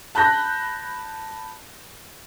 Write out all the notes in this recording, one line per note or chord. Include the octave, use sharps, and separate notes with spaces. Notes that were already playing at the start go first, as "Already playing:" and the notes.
A5 B5 F#6 G6 A#6